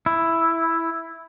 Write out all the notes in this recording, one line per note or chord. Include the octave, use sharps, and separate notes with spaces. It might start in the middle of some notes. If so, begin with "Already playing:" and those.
E4